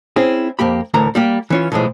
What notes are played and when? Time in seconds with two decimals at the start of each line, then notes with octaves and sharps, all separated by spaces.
0.16 C4 C#4 E4 G#4
0.59 F2 A#3 G4 B5
0.94 D2 A2 E3 A#4 A#5
1.15 G3 A#3 G4
1.50 E3 C#4 F4
1.72 B1 A2 E3 F3 G#3